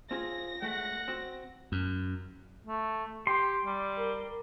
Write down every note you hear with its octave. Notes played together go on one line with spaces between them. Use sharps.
C4 F4 G#4 A#6
G#3 A3 F#5
C4 F#4
F#2
A3
G4 C6
G3
A#4